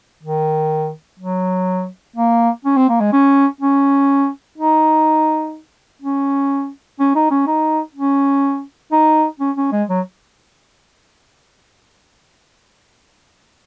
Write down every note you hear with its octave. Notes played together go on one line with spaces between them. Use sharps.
D#3
F#3
A#3
C#4
C4
A#3
G#3
C#4
C#4
D#4
C#4
C#4
D#4
C#4
D#4
C#4
D#4
C#4
C#4
G#3
F#3